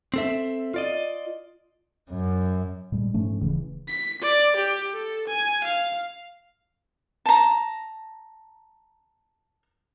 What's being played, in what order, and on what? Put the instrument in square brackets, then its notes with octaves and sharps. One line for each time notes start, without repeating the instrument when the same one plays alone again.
[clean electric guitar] C4 A4 E5
F4 D5 D#5
[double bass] F#2
[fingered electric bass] A#2 G3 G#3
G#2 F3 A3 C#4
D#1 C#3 E3
[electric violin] B6
D5
G4
A4
G#5
F5
[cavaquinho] A5 A#5